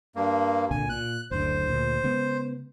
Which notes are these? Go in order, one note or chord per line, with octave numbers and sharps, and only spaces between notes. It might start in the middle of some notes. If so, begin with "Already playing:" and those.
G2 A#3
C2 A#2 D3 G#5
A#2 F#6
F#1 D2 D3 C5
D2 A#2
C#3 G#3 B3